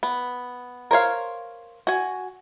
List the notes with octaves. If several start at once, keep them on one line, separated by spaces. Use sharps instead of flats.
B3
A#4 C5 C#5 F5
F#4 G#5